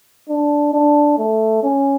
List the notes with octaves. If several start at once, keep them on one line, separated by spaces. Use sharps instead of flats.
D4
D4
A3
C#4